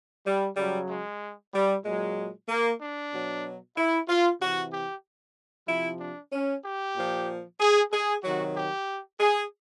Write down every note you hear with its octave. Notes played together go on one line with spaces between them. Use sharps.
G3
C#3 F#3 G3
G#3
G3
A#2 F#3 G#3
A#3
D4
B2 F#3
E4
F4
C3 E3 F#4
G4
C3 F3 E4
D4
C#4
G4
A#2 F3
G#4
G#4
C3 D#3 F#3 F#4
G4
G#4